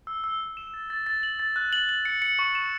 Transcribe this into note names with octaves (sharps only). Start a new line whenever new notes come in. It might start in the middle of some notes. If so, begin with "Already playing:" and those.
E6
E6
E6
E7
A6
A6
A6
F#7
A6
F#6
F#7
F#7
C#7
C#7
C#6
E7